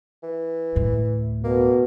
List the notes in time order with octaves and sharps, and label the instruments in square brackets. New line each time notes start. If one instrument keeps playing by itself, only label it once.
[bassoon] E3
[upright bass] D2 A2
[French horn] B2 [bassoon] A#3